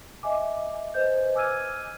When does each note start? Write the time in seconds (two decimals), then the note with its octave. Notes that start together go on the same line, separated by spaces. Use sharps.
0.23 D#5 E5 G#5 D6
0.94 B4 C5 D#5 G6
1.35 G#5 D6 E6 F6 G#6 D#7